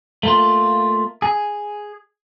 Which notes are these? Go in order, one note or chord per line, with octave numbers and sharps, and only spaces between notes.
A3 A#3 F4
G#4